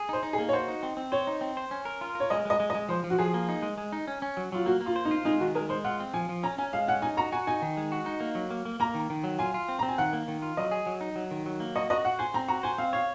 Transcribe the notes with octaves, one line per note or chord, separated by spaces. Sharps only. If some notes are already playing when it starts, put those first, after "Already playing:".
Already playing: G#4
D#4 C5
D#4
G#4
A#3
C#5
F#4 C5
D#4
C4
C4
C5 C#5
D#4
C4
C5
C#4
A#4
F4
A#4 C#5
G#3 D#5
G#3 D#5
G#3
D#5
G#3
F3 C5
F3
F#4
F3 G#4
A#3
D#4
G#3
G#3
D#4
C#4
C#4
F#3
F#3 F4
A#3 F#4
A#3
F4
C5
D#4
F4
G#3 D#4
D#3 F#4
G#3 A#4
G#3 C5
F4 F#5
C4
F3 G#5
F3
C#4 A#5
C#4 G#5
G#3 F5
C#4 F#5
D#4 G#5
F#4 A#5
F#4 G#5
D#4 G#5
D#3
G#3
F#4
D#4
A#3
F#3
A#3
A#3
A#3 A#5
D#3
D#3
F#3
F4 G#5
F4
C4
C4 A#5
G#5
D#3 F#5
A#3
D#3
F4
F#3 D#5
G#4
F#3
D#4
F#3
D#3
F#3
A#3
F#4 D#5
F#4 D#5
F#4 F#5
C5 G#5
C4 A#5
F#4 A#5
C5 G#5
C4 F5
C#5 F5